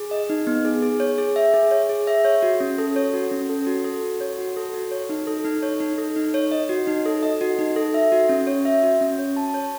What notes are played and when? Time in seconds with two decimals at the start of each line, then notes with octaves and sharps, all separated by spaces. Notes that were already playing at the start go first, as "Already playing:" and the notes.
Already playing: G#4
0.11 D#5
0.30 D#4
0.47 B3
0.65 G#4
0.83 G#4
1.00 C#5
1.18 G#4
1.36 E5
1.54 G#4
1.71 C#5
1.89 G#4
2.07 E5
2.25 C#5
2.43 F#4
2.60 C#4
2.78 A4
2.96 C#5
3.14 F#4
3.31 C#4
3.49 A4
3.67 F#4
3.85 A4
4.03 F#4
4.21 C#5
4.38 F#4
4.56 A4
4.74 F#4
4.91 C#5
5.09 D#4
5.27 A4
5.45 D#4
5.63 C#5
5.80 D#4
5.98 A4
6.16 D#4
6.34 C#5
6.52 D#5
6.69 F#4
6.87 D#4
7.06 A4
7.23 D#5
7.41 F#4
7.59 D#4
7.76 A4
7.94 E5
8.12 F#4
8.29 C#4
8.47 C#5
8.65 E5
8.83 F#4
9.01 C#4
9.19 C#5
9.36 A5
9.54 C#5